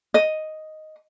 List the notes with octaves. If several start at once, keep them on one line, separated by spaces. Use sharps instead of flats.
D#5